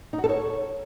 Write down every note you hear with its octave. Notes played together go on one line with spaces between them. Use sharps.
D#4
F#4
A4
C#5